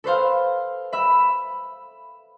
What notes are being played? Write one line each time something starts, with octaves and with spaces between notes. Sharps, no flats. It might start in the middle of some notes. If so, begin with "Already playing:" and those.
A4 B4 C5 F5
E5 B5